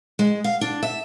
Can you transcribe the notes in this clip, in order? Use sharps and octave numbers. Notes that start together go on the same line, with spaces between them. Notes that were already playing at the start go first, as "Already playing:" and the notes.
G#3
F5
D4
E5